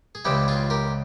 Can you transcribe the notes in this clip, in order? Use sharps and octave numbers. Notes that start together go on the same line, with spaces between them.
G#4
C#2 C#3 E3 G3 C4 E4 G4
F4 G#4
G4 A#4